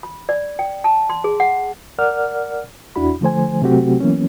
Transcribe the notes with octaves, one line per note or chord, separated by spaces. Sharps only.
B5
D5
G5
A5
C6
G#4
F#5
A#4 D5 F#5 F6
E2 D4 E4 F#4 B5
D3 F3 A3 C5 G#5
C3 F#3 A3 C4 F#4 G4
E3 F#3 A#3 B3 C#4